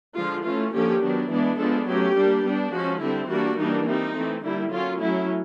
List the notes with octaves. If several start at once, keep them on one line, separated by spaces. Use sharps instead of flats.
D3 F3 G#3 F4
E3 A3 C#4 F4
D3 F3 A#3 C#4 G4
D#3 F#3 B3 D4
E3 G#3 B3 D4
F3 G#3 B3 D4 A4
F#3 A3 C#4 G4
G3 A#3 D4
G3 B3 D4
F3 G#3 C#4 F#4
D3 G3 C4 E4
E3 G3 A#3 D4 F#4
E3 G3 A#3 D4 D#4
G3 C4 D#4
E3 A3 C4
D3 G3 A#3 E4
F#3 A#3 C#4 F4
F#3 A3 C#4 E4